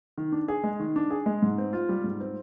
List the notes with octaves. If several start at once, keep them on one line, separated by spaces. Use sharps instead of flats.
D#3
D4
G#4
G#3
D#3
D4
G#4
G#3
G#2
C4
F4
G3
G#2
C4